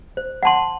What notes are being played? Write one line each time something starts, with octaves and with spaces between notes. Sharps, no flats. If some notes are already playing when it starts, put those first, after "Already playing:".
C5
F#5 A5 C6